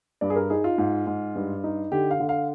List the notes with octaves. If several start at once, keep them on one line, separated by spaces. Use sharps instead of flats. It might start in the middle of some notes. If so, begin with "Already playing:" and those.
G2 D5
G#4
A#4
D#4 G#4
F4
G#2
G#2
G2
D#4
D3 G4
F5
D3
F5